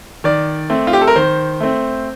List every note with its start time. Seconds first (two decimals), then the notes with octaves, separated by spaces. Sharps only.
0.24 D#3 D5
0.70 A3 C4
0.87 F4
0.93 G4
1.01 A4
1.07 A#4
1.16 D#3 C5
1.60 A3 C4